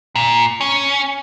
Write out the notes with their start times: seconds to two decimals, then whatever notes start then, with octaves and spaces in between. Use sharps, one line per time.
0.15 A#2
0.61 C#4